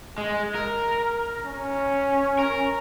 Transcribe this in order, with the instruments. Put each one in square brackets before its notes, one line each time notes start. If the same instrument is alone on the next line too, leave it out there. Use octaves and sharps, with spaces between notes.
[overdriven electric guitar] G#3
A#4
[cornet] C#4
[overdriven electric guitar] A#4